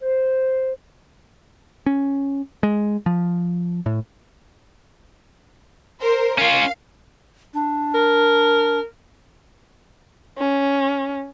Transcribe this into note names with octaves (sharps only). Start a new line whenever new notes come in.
C5
C#4
G#3
F3
A2
A#4 C5
C#4 F4 F5
D4
A#4
C#4